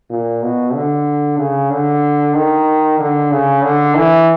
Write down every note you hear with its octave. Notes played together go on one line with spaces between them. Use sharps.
A#2
B2
D3
C#3
D3
D#3
D3
C#3
D3
E3